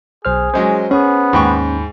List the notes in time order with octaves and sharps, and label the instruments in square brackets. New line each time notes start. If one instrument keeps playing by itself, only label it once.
[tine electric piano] B1 C5 F6 [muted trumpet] G#4
[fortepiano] F#3 G#3 C#4 [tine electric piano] C5
[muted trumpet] B3 [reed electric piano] C#4 [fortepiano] G#4
[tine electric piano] D#2 B5 [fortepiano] G#2 G5 C#6